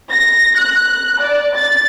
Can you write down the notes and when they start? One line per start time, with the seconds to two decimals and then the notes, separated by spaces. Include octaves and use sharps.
0.10 A#6
0.58 F#6
1.22 D5
1.56 A6